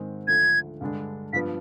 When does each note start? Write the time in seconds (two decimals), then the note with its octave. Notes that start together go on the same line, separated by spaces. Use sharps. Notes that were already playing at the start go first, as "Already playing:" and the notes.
Already playing: G#2 D#3 G#3 C4
0.27 D2 D3 F3 G#6
0.81 G2 D3 G#3 D4
1.33 G2 F3 B3 B6